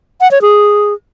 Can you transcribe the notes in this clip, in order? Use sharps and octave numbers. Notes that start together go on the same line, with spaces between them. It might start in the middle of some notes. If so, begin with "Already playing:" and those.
F#5
C#5
G#4